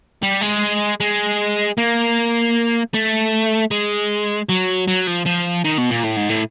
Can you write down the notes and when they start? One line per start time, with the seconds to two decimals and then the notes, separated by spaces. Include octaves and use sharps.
0.23 G3
0.41 G#3
1.01 G#3
1.78 A#3
2.94 A3
3.71 G#3
4.49 F#3
4.88 F#3
5.07 F3
5.26 F3
5.64 D#3
5.78 B2
5.91 A#2
6.03 A2
6.16 G#2
6.29 A2